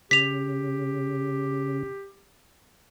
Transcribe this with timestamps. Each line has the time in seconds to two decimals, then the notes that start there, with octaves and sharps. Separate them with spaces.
0.11 C#3 G4 B6 F7